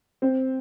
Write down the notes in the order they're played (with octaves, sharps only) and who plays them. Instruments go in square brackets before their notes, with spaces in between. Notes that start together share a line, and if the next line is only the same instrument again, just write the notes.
[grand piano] C4